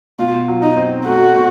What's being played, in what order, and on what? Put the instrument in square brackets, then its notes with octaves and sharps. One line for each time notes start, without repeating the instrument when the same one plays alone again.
[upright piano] B2 [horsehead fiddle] F4
[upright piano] F#3
[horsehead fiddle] D#4
[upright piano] C4
[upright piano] A3 [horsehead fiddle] F#4
[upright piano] B2